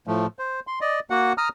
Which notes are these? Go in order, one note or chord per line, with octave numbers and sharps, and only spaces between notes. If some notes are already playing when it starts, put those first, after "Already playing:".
A2 F3 A3
C5
C6
D5 D#5
A#3 F#4 F#5
A#5 D#6 F6